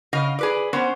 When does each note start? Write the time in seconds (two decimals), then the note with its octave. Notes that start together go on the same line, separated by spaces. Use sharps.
0.13 C#3 D#5 F5
0.39 G#4 B4 D5
0.73 B3 C#4 C5